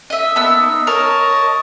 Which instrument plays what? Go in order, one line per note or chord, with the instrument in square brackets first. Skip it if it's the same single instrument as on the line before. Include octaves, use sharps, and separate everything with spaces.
[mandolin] D#5 E5
[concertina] A#3 A5 [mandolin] B3 E6
[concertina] D#4
[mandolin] A#4 [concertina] C#5 D#5 A5